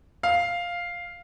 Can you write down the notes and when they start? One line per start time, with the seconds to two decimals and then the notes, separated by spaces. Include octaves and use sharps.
0.23 F5